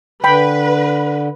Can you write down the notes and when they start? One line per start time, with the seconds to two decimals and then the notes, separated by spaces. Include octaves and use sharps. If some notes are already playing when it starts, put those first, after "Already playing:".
0.24 D3 B4 G5 B5